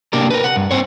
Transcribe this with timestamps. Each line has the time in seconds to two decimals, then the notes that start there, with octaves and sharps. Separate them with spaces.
0.13 C3 A#3 D4 G4 A#4
0.30 A#4 B4
0.44 F#5
0.56 G2
0.71 C4 C5 C#5